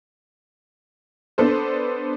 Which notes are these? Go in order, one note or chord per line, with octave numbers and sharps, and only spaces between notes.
B3 D4 A4 C5